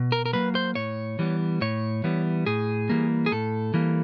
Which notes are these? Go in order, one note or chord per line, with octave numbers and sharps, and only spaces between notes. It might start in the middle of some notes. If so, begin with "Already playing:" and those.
Already playing: B2
A#4
A#4
F#3 A#3 B4
C5
A2 C#5
E3 G3 B3
A2 C#5
E3 G3 B3
A2 G#4
E3 G3 A#3
G#4
A2 A4
E3 G3 A#3